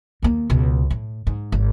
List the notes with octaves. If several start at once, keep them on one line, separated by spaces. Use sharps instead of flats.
D#2 A#3
C#2 B2
A2
G#2
G#1